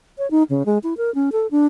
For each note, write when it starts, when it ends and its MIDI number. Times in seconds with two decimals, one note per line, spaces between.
0.18 0.30 73
0.31 0.43 63
0.50 0.65 49
0.66 0.78 56
0.83 0.94 64
0.97 1.13 70
1.15 1.30 61
1.32 1.47 69
1.51 1.67 62